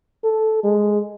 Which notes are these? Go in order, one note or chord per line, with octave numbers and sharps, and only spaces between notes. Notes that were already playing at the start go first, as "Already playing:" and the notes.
A4
G#3